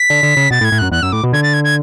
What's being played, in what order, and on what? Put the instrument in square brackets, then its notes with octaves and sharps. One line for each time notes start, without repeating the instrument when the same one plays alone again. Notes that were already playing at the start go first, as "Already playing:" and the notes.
Already playing: [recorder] B6
[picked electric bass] D3
D3
C#3
[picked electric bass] B2 [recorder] A6
[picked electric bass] A2
[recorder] G#6
[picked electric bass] A2
[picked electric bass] F#2 [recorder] F#6
[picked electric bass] E2 [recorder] F#6
[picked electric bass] F#2 [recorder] E6
[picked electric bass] A2 [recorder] D6
[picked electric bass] B2
[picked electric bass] D3 [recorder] G#6
[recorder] A6
G#6
G#6